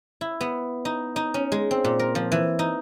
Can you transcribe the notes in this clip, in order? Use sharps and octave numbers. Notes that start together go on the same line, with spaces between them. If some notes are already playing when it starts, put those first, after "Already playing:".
E4
B3
D#4
D#4
C#4
G#3
C4
A#2
A#4
F3
E3
D#4